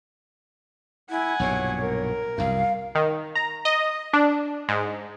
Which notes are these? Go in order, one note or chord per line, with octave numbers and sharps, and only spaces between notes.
E4 F#5 G#5
B1 G2 A#2 C#5
A#4
C2 F#2 F5
D#3
A#5
D#5
D4
G#2